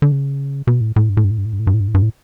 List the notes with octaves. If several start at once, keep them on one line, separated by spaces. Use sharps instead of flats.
D3
C#3
B2
A2
A2
G2
A2
G2
A2
G2
A2
G2
A2
G2
A2
G2
A2
G2
A2